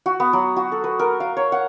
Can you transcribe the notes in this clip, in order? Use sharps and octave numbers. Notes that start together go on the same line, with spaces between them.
F#4
B3
F#3
F#4
A4
B4
A#4
F5
C#5
F#5